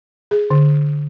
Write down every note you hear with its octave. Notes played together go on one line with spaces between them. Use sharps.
G#4
D3